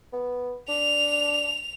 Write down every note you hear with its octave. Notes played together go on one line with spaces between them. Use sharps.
B3
D4 F7